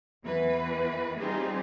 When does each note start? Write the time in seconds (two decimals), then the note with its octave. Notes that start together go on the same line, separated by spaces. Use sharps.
0.23 E2 E3 B4
1.20 G3 C4 D#4 F4 G4 G#4